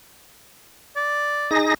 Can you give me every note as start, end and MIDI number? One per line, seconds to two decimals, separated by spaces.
0.96 1.51 74
1.51 1.74 63
1.51 1.74 68
1.51 1.74 94